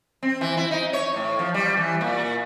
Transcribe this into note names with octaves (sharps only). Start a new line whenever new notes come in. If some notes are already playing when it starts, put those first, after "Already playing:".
C4
E3
E4
D#4
C#5
A2
F3
G3
E3
A#2